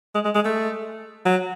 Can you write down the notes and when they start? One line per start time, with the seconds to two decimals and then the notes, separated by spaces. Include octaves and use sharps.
0.15 G#3
0.25 G#3
0.35 G#3
0.45 A3
1.26 F#3